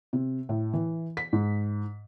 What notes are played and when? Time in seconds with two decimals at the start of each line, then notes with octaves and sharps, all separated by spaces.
0.13 C3
0.49 A2
0.73 E3
1.17 B6
1.33 G#2